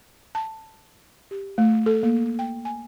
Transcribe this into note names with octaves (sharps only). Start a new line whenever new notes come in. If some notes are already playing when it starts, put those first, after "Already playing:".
A5
G4
A3
A4
A#3
G5
G#5